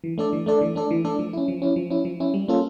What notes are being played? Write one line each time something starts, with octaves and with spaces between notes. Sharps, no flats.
E3
A3 D4 A4 D5
E3
A3 D4 A4 D5
E3
A3 D4 A4 D5
E3
A3 D4 A4 D5
F3
C#4 E4
F3
C#4 E4
F3
C#4 E4
F3
C#4 E4
G3
A#3 C#4 F4 A4